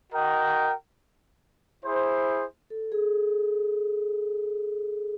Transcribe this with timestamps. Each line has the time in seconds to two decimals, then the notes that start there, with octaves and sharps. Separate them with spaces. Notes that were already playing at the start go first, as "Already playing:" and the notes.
0.13 F#4 A#4 D#5 G5
1.85 E4 G#4 C5
2.70 A4
2.92 G#4